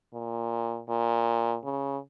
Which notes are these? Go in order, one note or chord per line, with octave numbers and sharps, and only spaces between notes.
A#2
A#2
C#3